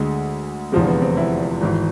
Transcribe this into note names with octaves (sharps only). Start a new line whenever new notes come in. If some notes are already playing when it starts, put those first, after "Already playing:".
Already playing: D2 D3 G#3
F1 E2 D3 F3 G#3 C4
B3
C4
E4
G#1 G#2 E3